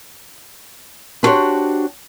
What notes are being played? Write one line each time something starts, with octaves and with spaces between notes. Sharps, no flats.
B3 D4 F#4 G4 C5 C#5